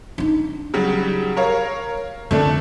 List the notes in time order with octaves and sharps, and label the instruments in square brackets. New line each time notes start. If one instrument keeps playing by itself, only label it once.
[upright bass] D4 D#4
[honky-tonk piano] C#3 F#3 G3
A#4 C#5 F5
[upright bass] F2 D3 [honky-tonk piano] A3 D4 A4